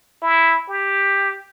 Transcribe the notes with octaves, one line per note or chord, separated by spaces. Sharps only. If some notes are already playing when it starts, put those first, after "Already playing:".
E4
G4